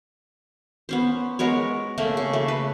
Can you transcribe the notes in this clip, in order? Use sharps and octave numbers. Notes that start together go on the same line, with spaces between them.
B3 C#4 C5
G#3 B3 A#4 C#5
C#3 A3 A#3
C#3
A3
B4